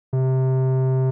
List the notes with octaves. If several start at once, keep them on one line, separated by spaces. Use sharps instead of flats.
C3